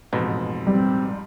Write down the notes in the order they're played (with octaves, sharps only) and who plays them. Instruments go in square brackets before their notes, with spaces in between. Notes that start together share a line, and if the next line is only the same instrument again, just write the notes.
[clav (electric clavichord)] A1 B2 [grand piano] F2 G#2
[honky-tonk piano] G3 [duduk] C4